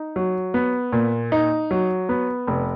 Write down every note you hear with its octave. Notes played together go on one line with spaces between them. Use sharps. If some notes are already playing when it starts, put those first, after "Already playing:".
Already playing: D#4
F#3
B3
A#2
D#4
F#3
B3
F1